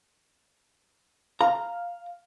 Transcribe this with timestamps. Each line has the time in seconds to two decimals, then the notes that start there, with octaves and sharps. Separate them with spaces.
1.41 F5 A#5